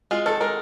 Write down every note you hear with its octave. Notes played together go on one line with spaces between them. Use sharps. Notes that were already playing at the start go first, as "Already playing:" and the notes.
G#3 F4
D#3 A4
G#3 A#4